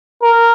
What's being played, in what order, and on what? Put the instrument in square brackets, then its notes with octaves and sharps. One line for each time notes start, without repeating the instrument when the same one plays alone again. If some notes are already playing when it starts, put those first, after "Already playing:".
[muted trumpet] A#4